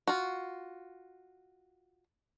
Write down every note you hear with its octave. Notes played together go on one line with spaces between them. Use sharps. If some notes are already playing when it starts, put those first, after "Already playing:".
F4 F#4